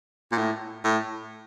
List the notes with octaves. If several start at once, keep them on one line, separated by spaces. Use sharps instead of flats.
A#2
A2
A2